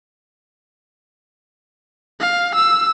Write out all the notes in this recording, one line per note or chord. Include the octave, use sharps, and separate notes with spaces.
F5
E6